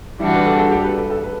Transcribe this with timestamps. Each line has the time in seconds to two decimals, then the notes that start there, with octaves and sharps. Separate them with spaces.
0.19 E3 G3 D4 E4 F#4
0.33 B4
0.46 A4
0.59 A4
0.71 G4
0.84 B4
0.97 A4
1.10 A4
1.23 B4